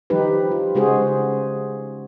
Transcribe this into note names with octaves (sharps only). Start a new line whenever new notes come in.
D#3 F3 G3 D#4 G4 B4
F4
C#3 G#3 F#4 G#4 C5